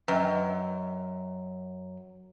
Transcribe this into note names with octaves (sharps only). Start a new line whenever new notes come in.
F#2 B4 D#5 G5